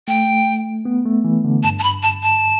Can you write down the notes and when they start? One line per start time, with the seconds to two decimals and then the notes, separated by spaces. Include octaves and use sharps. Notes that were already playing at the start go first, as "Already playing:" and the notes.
0.08 A3 G5
0.85 B3
1.05 A3
1.25 E3
1.45 D3
1.63 G2 A5
1.79 A5
1.83 B5
2.03 A5
2.22 A5